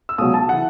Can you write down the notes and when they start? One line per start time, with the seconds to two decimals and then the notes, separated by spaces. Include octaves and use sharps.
0.09 E6
0.18 C#2 B2 F#3 D#6
0.34 A5
0.49 E3 F#5